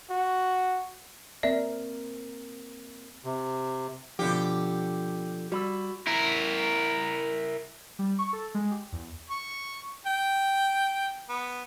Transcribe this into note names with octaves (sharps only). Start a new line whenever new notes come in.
F#4
A#3 C4 A#4 D5 E5
C3
B2 D3 F3 G4
G3 F#4 B5 E6
E4 A#4
G3
C#6
A4
G#3
G4
E2
C#6
G5
B3